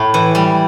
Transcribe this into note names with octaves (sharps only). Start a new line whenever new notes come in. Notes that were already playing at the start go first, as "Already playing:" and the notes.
Already playing: A2 E4
E3
G3